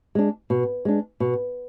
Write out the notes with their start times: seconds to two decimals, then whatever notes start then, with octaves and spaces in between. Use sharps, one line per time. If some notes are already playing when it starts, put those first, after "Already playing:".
0.15 G#3 D4
0.50 B2
0.85 G#3 D4
1.20 B2